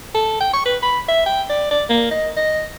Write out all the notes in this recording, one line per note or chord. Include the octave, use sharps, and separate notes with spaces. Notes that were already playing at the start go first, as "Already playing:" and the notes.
A4
G5
C#6
B4
B5
E5
G5
D5
D5
A#3
D#5
D#5